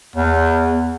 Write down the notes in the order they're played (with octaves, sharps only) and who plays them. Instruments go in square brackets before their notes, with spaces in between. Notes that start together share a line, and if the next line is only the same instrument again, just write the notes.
[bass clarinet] E2